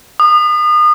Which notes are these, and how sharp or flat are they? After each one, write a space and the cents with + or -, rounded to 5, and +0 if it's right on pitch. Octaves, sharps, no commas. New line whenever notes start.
D#6 -35